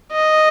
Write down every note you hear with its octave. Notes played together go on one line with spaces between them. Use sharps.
D#5